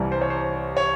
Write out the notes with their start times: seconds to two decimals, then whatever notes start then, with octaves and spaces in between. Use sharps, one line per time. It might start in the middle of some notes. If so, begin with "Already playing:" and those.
Already playing: C2 C3 E3 G3
0.12 C5
0.22 C#5
0.30 C5
0.77 C#5